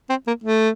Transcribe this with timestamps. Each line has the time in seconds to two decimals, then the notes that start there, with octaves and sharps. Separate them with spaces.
0.10 C4
0.27 A#3
0.44 A3